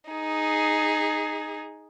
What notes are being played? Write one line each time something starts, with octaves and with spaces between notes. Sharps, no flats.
D#4 G#4